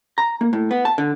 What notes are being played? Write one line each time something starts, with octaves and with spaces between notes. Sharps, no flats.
A#5
A#3
A2
B3
A5
D3